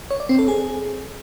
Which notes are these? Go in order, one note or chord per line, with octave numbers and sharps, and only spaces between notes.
C#5
D5
C4
A4
G#4